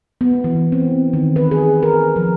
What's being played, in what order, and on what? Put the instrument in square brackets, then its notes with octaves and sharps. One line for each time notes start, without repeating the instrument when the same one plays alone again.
[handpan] B3
E3
C4
D#3
B4
G#4
A#4
F3